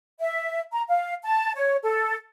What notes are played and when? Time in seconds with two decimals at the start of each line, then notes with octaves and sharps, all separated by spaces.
0.20 E5
0.72 A#5
0.89 F5
1.23 A5
1.56 C#5
1.84 A4